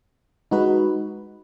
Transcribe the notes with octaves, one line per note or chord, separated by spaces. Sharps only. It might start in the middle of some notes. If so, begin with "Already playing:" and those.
G#3 D#4 F#4 B4